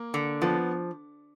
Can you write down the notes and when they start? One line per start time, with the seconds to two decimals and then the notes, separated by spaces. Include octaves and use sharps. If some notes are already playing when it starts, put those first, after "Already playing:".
Already playing: A#3
0.14 D3
0.42 F3 B3